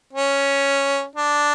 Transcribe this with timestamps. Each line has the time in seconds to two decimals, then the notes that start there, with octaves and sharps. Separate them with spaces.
0.13 C#4
1.16 D4